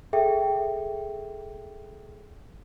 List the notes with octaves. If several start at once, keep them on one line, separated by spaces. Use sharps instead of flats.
G#4 A4 E5 G5